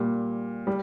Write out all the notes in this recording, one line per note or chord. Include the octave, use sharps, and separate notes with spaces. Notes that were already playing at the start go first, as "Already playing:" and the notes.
Already playing: A#2 G3
G3